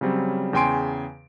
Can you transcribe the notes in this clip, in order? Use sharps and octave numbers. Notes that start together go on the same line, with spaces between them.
C#3 F#3 G3 C4
E2 C#3 G5 G#5 C6 D7